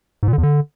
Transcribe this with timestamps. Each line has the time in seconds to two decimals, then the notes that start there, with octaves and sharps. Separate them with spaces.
0.23 G#2
0.28 A#2
0.33 D3
0.38 E2
0.43 D3